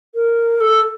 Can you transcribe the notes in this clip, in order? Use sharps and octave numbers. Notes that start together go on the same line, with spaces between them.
A#4
A4